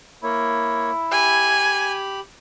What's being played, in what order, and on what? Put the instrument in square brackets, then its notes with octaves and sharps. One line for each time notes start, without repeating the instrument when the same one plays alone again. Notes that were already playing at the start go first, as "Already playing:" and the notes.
[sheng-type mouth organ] A#3 C#5 [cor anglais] E4
[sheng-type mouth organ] G4 B5 [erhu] G#5